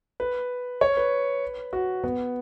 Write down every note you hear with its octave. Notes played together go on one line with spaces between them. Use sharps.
B4
C#5
B4
F#4
B3